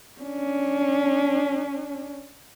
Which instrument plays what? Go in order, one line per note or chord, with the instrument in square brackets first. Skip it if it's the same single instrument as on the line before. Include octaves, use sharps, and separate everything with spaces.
[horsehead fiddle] C#4 D4